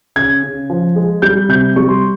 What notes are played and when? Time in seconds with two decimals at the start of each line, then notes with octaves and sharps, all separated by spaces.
0.16 C#3 G#6
0.43 C#3
0.70 F3
0.96 G#3
1.22 G3 G6
1.49 C3 G6
1.76 G3 C#6
1.89 C6